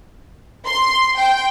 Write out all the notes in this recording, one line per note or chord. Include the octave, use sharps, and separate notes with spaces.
C6
G5